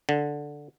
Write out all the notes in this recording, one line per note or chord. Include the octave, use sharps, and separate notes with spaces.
D3